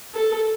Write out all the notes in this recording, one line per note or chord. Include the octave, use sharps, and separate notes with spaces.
A4